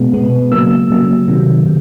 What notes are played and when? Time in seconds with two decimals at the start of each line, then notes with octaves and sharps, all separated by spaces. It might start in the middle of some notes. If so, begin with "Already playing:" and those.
Already playing: B2 G#3 B3
0.13 B2 G#3 B3
0.52 C#3 F#3 A#3 E6
0.90 C#3 F#3 A#3
1.28 C3 D#3 F#3
1.66 C3